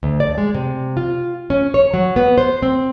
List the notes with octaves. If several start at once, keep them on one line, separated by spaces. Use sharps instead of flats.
D2
D5
G#3
C3
F4
C#4
C#5
F#3
B3
C5
C4